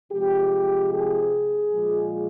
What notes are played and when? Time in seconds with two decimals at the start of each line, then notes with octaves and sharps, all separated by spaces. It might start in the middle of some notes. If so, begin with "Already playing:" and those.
0.12 C3 F3 G#3 G4
0.92 G#4
1.73 A#2 F3 G#3